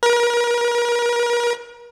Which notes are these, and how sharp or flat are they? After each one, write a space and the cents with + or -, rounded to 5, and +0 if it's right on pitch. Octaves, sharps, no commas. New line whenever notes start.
A#4 +40